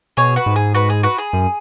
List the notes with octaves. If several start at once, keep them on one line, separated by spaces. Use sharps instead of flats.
B2 G#4 C#5
F#4 B4
G#2
G#4
F#4 B4
G#4
F#4 B4
G#4
F#2